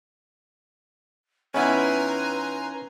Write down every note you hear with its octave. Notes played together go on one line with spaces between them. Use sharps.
D#3 B3 C#4 E4 B4 G#5 A#5 C6